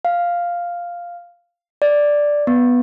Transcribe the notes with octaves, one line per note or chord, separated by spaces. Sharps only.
F5
D5
B3